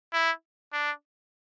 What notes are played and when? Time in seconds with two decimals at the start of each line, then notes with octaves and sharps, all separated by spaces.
0.13 E4
0.73 D4